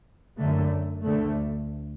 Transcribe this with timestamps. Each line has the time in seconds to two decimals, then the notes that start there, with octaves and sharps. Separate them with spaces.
0.37 F#2 D3 A3
1.03 D2 D3 A3